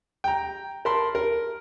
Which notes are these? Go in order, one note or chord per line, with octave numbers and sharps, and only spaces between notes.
G5 A#5
A#4 A5 B5 C6
A#4